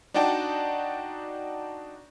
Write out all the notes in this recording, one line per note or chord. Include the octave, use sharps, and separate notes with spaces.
D4 D#4 F#4 D5 G5 A5